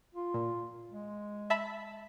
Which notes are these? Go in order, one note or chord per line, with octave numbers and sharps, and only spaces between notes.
F4
A#2
G#3
E5 A5 B5